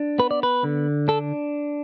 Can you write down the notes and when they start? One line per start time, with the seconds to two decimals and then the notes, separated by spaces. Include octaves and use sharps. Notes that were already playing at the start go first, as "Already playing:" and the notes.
Already playing: D4
0.19 B3 B4
0.31 D5
0.43 B4
0.64 D3
1.08 D4 A4